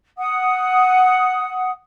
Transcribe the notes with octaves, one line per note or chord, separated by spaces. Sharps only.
F#5 D#6